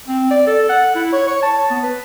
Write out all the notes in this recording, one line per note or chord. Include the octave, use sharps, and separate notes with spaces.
C4
D5
A4
F#5
E4
C#5
C#5
A5
B3
B4